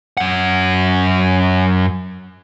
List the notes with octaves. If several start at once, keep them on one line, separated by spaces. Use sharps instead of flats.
F#2 F#5